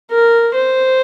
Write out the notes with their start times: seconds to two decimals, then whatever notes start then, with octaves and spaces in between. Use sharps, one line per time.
0.11 A#4
0.55 C5